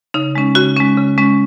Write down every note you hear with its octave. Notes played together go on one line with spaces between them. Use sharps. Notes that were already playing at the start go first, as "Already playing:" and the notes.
C#3 D#4
G#3 C#4
C#3 F#4
G#3 C#4
C#3
G#3 C#4